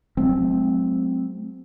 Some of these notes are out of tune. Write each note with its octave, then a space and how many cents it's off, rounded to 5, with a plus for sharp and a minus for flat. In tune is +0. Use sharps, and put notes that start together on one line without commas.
F#3 +0 A3 -40 C4 +0